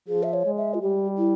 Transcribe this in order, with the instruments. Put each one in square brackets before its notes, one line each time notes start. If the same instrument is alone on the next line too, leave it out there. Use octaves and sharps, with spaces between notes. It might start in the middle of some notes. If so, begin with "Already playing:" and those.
[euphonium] F3 [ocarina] G#4
[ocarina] E5
C#5
[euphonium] G#3
[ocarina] E5
F4
[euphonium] G3 [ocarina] G4
[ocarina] E4